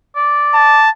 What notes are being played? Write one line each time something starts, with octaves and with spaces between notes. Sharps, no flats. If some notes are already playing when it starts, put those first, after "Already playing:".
D5
A5